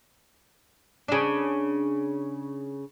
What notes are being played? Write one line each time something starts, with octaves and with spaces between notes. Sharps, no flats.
C#3 D4